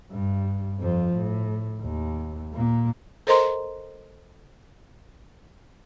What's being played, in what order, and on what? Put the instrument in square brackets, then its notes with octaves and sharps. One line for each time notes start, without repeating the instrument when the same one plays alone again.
[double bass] G2
F2 F3
A2
D#2
A#2 A#3
[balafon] A4 A#4 C5 D#5 A#5 C6